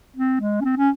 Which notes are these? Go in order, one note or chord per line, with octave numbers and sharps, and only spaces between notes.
C4
G#3
C#4
C4
C#4